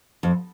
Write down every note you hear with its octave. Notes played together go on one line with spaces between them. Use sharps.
F2